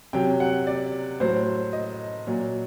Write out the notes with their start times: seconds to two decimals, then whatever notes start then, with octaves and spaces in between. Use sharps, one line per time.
0.13 C3 F#3 G5
0.40 F#5
0.67 D5
1.20 A2 F#3 C5
1.73 D#5
2.27 A#2 F#3